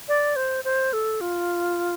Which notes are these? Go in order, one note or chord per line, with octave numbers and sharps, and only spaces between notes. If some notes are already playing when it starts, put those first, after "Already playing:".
D5
C5
C5
A4
F4